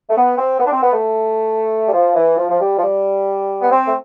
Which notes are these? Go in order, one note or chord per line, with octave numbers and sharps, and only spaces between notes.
A3
B3
C4
B3
D4
C4
B3
A3
G3
F3
E3
F3
F3
G3
F3
G3
B3
C4
A3